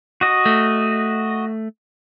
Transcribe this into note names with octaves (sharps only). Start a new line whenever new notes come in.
F#4 D#5
A3